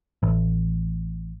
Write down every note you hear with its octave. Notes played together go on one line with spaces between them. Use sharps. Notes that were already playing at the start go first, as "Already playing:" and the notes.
A1